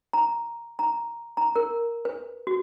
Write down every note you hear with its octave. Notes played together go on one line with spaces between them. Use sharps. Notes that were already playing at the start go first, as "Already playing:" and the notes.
A#5
A#5
A#5
A#4
B4
F#4